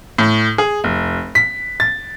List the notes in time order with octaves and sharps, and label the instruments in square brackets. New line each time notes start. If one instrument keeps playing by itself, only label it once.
[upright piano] A2
G#4
F1
B6
A6